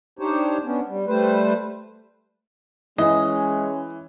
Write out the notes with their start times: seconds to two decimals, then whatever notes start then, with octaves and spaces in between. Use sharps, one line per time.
0.19 D4 D#4 G4 C5 C#5
0.64 B3 C#4 D4
0.88 G3
1.07 G3 A3 B4 C5
2.98 E3 G#3 C#4 D#5